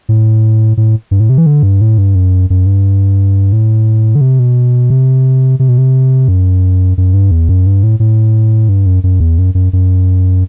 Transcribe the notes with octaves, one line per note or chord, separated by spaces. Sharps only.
A2
A2
G2
A2
C3
E3
D3
G2
A2
G2
F#2
F#2
G2
A2
D3
C3
B2
C3
C3
B2
C3
F#2
F#2
G2
E2
F#2
G2
A2
A2
G2
F#2
F#2
E2
F#2
F#2
F#2